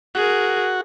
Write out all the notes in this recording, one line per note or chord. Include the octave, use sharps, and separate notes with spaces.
F#4 G#4 A#4